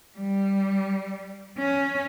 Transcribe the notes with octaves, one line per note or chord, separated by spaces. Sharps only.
G3
C#4